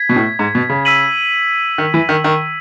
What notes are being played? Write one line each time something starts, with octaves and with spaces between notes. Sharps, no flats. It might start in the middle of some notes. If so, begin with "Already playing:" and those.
Already playing: G#6 B6
B2
A2
G#2
B2
C#3
E6 B6 D#7 F#7
D#3
E3
D#3
D#3